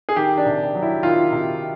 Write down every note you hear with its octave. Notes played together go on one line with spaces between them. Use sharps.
G#4
D#3 G4
D4
C3
F#3
E4
D#3 F4
C3